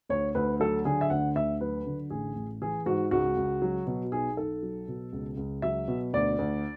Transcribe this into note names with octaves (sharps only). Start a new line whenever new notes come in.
D2 C#5
D2 B4
F#3 A4
D3 G#4
E5
D2 F#5
D2 E5
F#3 B4
D3
A1 G#4
A1
E3 G#4
G#2 F#4
C#2 F#4
C#2
F#3
B2
B1 G#4
B1 A4
F#3
B2
C#2
C#2
F#3 E5
B2
D2 D5
D2